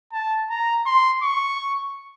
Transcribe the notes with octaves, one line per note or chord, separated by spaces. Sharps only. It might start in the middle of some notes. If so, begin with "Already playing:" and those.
A5
A#5
C6
C#6